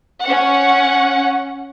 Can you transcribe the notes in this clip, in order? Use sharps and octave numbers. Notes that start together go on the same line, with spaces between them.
C#4 F#5